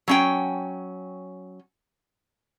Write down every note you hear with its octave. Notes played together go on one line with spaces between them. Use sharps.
F#3 C#4 G5